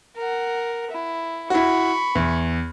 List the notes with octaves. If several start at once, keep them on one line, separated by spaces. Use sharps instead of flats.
A#4 F#5
E4
E4 F#4 B5 C#6
E2